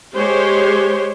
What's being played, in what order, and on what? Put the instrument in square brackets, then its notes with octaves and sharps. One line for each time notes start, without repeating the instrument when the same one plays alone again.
[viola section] G#3 G4 G#4 C5 C#5